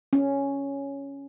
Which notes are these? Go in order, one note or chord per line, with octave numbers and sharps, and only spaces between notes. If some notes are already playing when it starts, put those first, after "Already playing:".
C#4